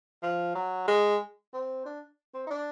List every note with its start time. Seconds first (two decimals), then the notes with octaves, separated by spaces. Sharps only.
0.23 F3
0.55 F#3
0.87 G#3
1.53 C4
1.85 D4
2.34 C4
2.47 D#4
2.51 D4